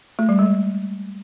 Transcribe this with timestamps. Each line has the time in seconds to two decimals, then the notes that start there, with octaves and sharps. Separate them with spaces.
0.19 A3
0.29 G3
0.39 G#3